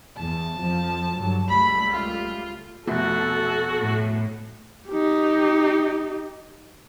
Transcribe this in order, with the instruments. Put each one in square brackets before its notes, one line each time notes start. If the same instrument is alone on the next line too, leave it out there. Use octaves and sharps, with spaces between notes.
[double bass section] E2 [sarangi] A5
[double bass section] F2 F3
G2 D3 F#3
[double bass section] C#2 G3 A3 [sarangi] B5
[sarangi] F4
[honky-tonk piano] F1 B2 A3 [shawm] F#4 [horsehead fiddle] A4
[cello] A2
[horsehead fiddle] D#4 G4